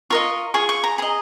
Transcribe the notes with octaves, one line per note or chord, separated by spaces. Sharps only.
F4 A#4 D#5 C#6
F4 G#4 C#6
C#6
A#5
G#4 D#5 A#5